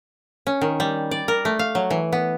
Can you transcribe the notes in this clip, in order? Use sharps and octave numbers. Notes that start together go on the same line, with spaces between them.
C#4
D#3
G3
D5
A#4
A3
F5
F#3
E3
B3